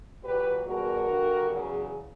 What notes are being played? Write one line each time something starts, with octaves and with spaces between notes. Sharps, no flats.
A#2 F#3 G4 B4
E2 B2 G3 F#4 A#4
G2 D3 G3
E2 C#3 F#3